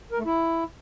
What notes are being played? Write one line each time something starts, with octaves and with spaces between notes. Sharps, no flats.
A#4
A3
E4